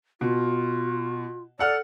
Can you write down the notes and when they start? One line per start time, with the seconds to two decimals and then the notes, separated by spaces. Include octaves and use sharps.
0.21 B2 F4
1.59 A4 D5 F#5 F6